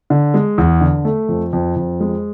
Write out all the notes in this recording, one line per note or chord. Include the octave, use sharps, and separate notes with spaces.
D3
G#3
E2
D3
A3
F2
F2
F2
G#3